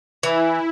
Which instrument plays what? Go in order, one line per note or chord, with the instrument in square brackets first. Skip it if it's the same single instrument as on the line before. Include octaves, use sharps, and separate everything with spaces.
[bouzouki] E3 [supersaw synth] E4